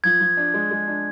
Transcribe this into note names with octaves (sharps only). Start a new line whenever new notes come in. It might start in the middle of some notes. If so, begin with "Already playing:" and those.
F3 G#6
F3
D4
G#3
G#3
D4